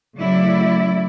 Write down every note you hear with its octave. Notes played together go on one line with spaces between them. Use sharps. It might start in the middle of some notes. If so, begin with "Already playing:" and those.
C#3 F#3 A3 E4 D5